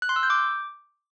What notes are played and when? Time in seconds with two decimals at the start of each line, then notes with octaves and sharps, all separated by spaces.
0.02 F#6
0.09 C6
0.16 E6
0.23 G6
0.30 D6